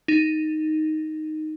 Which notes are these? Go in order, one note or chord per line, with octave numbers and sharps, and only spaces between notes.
D#4